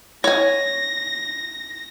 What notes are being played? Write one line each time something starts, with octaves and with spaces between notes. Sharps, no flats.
C#5 G#5 A#6